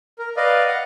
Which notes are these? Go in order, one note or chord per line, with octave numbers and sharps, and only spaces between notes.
A#4
B4 D5 D#5 F5
F5 F#5